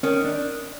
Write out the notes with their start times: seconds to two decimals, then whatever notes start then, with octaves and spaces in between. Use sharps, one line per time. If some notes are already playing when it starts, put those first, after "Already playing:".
0.03 D#3 C#4
0.25 D4